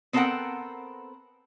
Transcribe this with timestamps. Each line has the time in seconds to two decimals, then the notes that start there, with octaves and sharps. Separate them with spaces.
0.13 B3 C4 A4 A#4 F#5 G5